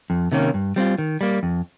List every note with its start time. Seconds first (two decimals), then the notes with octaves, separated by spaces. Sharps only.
0.10 F2
0.32 C3 D#3 A#3 C#4
0.54 G2
0.76 G3 C4 F4
0.98 D#3
1.21 G3 A#3
1.43 F2